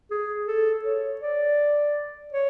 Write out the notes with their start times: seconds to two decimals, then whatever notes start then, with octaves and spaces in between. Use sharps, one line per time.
0.11 G#4
0.47 A4
0.84 C#5
1.21 D5
2.33 C#5